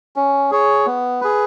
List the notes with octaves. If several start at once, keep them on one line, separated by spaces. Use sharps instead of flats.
C#4
G#4 C#5
B3
G#4 B4